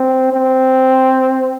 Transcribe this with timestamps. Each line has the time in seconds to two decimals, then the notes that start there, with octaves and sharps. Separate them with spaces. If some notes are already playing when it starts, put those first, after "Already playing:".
Already playing: C4
0.33 C4